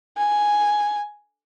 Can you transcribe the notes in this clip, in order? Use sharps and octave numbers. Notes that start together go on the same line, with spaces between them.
G#5